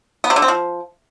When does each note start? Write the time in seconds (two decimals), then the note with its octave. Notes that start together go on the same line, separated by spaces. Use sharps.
0.24 B3
0.30 C3
0.36 D3
0.42 C4
0.48 F3